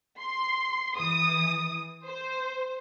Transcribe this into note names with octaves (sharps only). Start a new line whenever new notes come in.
C6
E3 D#6
C5